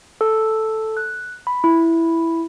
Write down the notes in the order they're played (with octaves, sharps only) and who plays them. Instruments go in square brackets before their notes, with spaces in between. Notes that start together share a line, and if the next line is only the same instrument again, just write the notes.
[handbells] A4
F#6
B5
E4